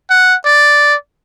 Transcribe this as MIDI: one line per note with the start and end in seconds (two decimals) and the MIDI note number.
0.10 0.35 78
0.46 0.95 74